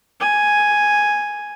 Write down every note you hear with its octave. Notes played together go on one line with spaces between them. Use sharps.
G#5